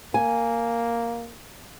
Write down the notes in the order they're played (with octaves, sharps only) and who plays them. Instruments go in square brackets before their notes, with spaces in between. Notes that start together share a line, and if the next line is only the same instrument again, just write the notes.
[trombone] A#3 [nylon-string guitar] G#5